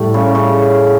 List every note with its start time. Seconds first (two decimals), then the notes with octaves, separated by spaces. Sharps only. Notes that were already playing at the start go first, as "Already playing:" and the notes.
Already playing: A2 G3 A3
0.14 C#3
0.35 C#3